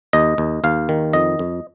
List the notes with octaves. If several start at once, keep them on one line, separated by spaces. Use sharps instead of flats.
D#2 D#5
D#2
D#2 F5
D#3
F2 D#5
F2